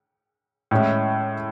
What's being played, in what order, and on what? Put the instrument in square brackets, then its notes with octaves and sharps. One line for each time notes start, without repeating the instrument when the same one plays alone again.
[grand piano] A2 G#3 C#4 E4